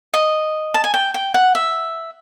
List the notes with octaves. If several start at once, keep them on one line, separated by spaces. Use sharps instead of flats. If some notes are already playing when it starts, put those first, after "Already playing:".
D#5
A5
G#5
G5
G5
F#5
E5